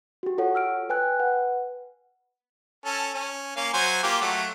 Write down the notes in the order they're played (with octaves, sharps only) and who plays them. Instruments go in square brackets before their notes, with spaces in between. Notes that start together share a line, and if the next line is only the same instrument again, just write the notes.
[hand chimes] F#4 G4
F4 G4 A4 C#5 F#5
E6 F6 D7
B4 G5 G#5 F#6
B4 F#5
[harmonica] C#4 A4
C#4
A#3 C#4 F5
F#3 C5 G#5
A#3 F4 G4
F#3 A3